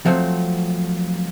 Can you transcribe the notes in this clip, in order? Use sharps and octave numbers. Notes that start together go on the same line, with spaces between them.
F3 F#3 A3 C4